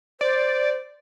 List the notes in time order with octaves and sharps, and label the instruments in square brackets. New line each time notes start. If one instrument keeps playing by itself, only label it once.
[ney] C5 [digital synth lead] D5